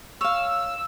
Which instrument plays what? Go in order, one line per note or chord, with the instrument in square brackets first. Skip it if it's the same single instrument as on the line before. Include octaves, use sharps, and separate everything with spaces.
[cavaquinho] C#5 F5 [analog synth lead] E6